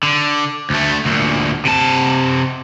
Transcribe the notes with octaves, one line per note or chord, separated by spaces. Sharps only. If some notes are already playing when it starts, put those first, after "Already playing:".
D3
D2 A3
D2 A#2
C3 A5